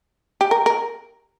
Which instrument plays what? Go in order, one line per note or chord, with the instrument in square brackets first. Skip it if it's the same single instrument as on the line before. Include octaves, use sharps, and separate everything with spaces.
[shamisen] G4
A#4
A#4